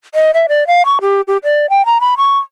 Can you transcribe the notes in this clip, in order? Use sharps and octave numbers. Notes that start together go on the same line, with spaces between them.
D#5
E5
D5
F5
C#6
G4
G4
D5
G5
A#5
B5
C#6